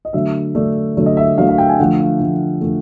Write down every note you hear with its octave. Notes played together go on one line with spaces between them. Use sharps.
D#5
D3 F#3 A3 E5
D3 F#3 A3 D5
D3 F#3 A3
D#5
E5
D3 F#3 A3 F5
F5
G5
G#5
D3 F3 A3 F#5
F5
D3 F3 A3
D3 F3 A3